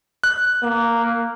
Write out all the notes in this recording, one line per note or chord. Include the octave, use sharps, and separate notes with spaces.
F#6
A#3